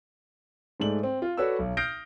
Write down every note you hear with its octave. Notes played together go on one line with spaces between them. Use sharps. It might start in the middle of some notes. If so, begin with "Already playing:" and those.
G#2 G#3 A3 D5 F#7
C4
F4
F#4 A4 B4 C#5 D5 E6
B1
D#6 F6 G6 A#6 C7 D7